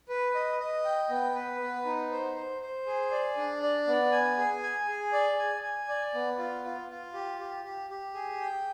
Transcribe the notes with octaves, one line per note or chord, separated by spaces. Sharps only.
B4
D#5
D#5
G5
B3
B4
B3
D#4
C5
C5
C5
G#4
D5
D4
D5
B3
G#5
G#4
G#5
G#4
D5
G#5
G#5
D5
B3
F4
F4
F4
G4
G4
G4
G4
G#4
G5